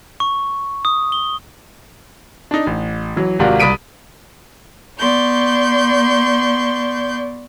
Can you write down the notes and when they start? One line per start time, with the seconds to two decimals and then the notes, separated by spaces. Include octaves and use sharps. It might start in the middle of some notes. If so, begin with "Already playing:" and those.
0.20 C#6
0.85 D#6
1.12 G7
2.51 D4 D#4
2.67 A1
3.16 E3 F#3
3.39 G#1 C3 F4 F#4 A#4 D5
3.60 C2 B5 D#6 B6 D7 D#7
4.98 B3 D5 C6 C#6 G6